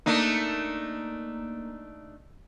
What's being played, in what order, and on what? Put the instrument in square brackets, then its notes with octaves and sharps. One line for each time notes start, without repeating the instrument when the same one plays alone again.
[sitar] A3 D4 D#4 [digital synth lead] A#3